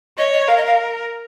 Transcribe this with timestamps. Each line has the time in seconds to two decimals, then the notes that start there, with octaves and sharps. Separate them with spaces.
0.18 C#5 D#5
0.33 D#5
0.47 A#4 F5
0.57 D#5
0.67 F5